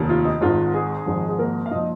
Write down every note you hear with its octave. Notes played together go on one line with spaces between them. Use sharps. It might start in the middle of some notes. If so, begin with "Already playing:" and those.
Already playing: F1 D#2 D#3
F4
D#4
G#1 G#2 D#3 F4
G#3 G#4
G#1 G#2 F3
G#4
A#3 A#4
F5
A#2 F3 D#4 D#5